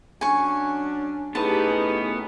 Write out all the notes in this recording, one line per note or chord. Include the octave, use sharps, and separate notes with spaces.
F#3 C#4 D4 G#5 C#6
A2 B3 C#4 D#4 G4 G#4 B4 A5